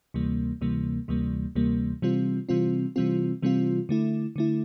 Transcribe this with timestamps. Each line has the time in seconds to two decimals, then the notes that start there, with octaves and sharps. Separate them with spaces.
0.14 D2 C3 E3 G3 A#3
0.61 D2 C3 E3 G3 A#3
1.08 D2 C3 E3 G3 A#3
1.55 D2 C3 E3 G3 A#3
2.02 C3 E3 G3 C4 F4
2.49 C3 E3 G3 C4 F4
2.96 C3 E3 G3 C4 F4
3.42 C3 E3 G3 C4 F4
3.89 D3 A3 E4
4.36 D3 A3 E4